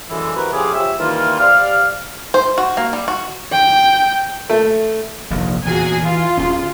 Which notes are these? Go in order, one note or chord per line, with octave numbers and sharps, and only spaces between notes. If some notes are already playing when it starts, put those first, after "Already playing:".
F#2 A2 D3 E3 G#3 E5
C3 E3 F#4 A#4 B4
F2 C#3 F3 G4 G#4
F3 G4 C#5 E5
D#3 E3 G3 A#3 F4
C3 G3 D5 F5 F6
C5
F#4
A#3
G3
F#4
G5
A3
F1 A#1 D#2
E2 A#2 C#3 F#4 G#4 G#5
E3 F4
D1 C#4